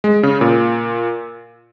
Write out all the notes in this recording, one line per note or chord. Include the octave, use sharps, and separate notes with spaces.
G#3
C#3
A#2